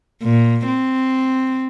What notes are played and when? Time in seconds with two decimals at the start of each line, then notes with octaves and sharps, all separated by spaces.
0.23 A#2
0.67 C4